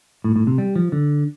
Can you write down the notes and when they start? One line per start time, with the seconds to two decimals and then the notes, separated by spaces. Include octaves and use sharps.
0.24 A2
0.36 A2
0.47 C3
0.58 G3
0.76 F3
0.92 D3